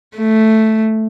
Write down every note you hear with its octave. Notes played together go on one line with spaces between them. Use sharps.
A3